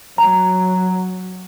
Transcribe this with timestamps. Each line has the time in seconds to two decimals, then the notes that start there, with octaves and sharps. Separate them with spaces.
0.18 F#3 A#5